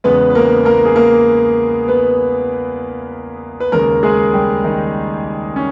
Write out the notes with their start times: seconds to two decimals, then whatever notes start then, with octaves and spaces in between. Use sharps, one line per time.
0.04 E2 C#3 G#3 B3 B4
0.30 B4
0.35 A#3 A#4
0.65 A#3 A#4
0.85 G#4
0.96 A#3 A#4
1.88 B3 B4
3.60 B4
3.72 D#2 C#3 G#3 A#3 A#4
4.03 G#3 G#4
4.33 G3 G4
4.64 D#3 D#4
5.56 C#4